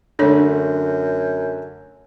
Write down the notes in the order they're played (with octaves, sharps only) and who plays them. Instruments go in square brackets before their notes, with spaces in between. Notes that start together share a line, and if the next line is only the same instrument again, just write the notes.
[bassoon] F#2 [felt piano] D3 A3 [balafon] D4 A4 C#5